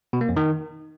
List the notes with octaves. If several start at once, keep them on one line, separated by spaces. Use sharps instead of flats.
B2
A#3
F2
D#3